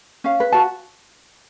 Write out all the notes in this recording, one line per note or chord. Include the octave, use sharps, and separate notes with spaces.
C#4 F5
B4
F#4 A5